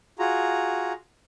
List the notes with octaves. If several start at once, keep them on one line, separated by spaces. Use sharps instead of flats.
F4 F#4 G#4 A#5